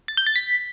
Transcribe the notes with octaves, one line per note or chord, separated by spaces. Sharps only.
A6
G6
A6
B6